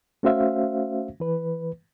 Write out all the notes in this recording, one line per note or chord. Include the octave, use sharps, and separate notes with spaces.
A3 C#4 F#4 C5 E5 F5
E3 B4